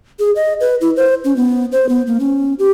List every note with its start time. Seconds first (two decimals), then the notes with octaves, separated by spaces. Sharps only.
0.19 G#4
0.36 D#5
0.60 B4
0.81 E4
0.97 C5
1.24 C#4
1.36 B3
1.72 C5
1.89 B3
2.07 A#3
2.20 C#4
2.59 G4